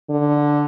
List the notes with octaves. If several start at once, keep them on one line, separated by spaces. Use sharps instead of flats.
D3